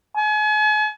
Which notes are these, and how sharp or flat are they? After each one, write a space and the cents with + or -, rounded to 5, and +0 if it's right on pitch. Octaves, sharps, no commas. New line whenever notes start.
G#5 +40